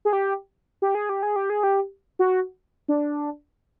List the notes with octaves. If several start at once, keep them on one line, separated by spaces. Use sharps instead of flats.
G#4
G4
G4
G#4
G4
G#4
G4
G#4
G4
F#4
D4